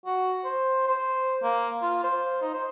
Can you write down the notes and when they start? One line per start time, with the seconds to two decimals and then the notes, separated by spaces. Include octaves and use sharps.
0.06 F#4
0.45 C5
0.87 C5
1.43 A#3
1.82 F4
2.03 C5
2.42 D#4
2.54 C5